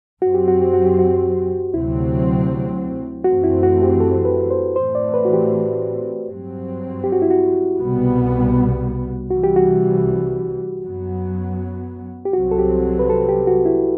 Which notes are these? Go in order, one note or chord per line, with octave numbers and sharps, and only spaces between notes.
F#2 F#3 C4 F#4
G4
F#4
G4
F#4
G4
F#4
D2 C3 F#3 C4 E4
F#2 E3 A3 C4 F#4
E4
F#4
G4
A4
B4
C5
A2 E3 A3 C4 C5
D5
B4
F#4
G4
G2 F#3 C4
G4
F#4
E4
F#4
C2 B2 G3 B3
C2 C3 E3 G3 F#4
G4
F#4
F#2 F#3 B3
G4
C2 C3 F#3 C4 F#4
A4
G4
B4
A4
G4
F#4
E4